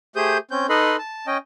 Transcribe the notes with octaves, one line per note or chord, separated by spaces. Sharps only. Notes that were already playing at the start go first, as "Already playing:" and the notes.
A3 G4 G#4 C5 D#6 G6
C4 C#4 G6
D#4 A4 B4 D#5 B5 C6
A5
C#4 D#5 G5